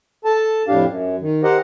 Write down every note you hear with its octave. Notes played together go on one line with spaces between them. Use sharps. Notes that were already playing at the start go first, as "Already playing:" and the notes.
A4 A5
F2 A2 D4 G4 F5
F#2
D#3
G4 A#4 C5 D#5 F#5